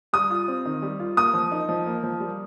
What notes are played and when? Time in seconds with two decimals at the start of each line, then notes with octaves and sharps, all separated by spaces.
0.13 G3 D#6
0.30 F4
0.48 C4
0.65 D#3
0.82 G3
1.00 F4
1.17 A#3 D#6
1.34 F3
1.52 D#4
1.69 F3
1.86 A#3
2.04 F3
2.20 G3